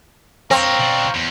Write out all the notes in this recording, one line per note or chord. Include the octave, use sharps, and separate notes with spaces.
C4 A#4 C#5 F5 A#5 C#6
B2 D4
E2